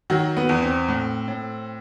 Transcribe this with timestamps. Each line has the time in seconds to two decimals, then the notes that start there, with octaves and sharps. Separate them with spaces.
0.10 D#3 F#3 F#4
0.37 B3
0.49 E2
0.62 C4
0.88 A2
1.28 A2